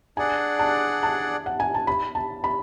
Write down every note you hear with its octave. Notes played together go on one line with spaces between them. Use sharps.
D4 G#4 D5 F#5 G#5
A5
A5
F#5
G#5
A5
B5
A5
B5